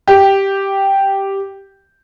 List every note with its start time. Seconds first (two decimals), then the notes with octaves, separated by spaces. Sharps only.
0.08 G4